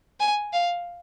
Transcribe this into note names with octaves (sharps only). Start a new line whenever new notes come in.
G#5
F5